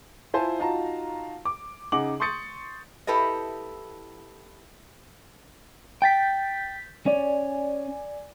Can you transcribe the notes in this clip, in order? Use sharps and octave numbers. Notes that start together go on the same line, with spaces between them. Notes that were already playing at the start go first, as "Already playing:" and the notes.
E4 F4 C5 G#5 A5
D#4 F4 F#4 F5 A5 A#5
D6
C#3 D#4 G#4 F#5 D6 F#7
C6 C#6 D#6 G6 A6 C#7
E4 G4 A4 B4 D#5
G5 G6 A6 B6
C#4 D5 G#5